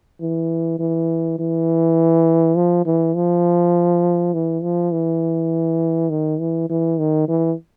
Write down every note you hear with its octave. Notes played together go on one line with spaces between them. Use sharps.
E3
E3
E3
F3
E3
F3
E3
F3
E3
D#3
E3
E3
D#3
E3